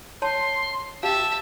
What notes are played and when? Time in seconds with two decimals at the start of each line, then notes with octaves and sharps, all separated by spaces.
0.22 C#5 A5 C6
1.03 G4 E5 F5 A5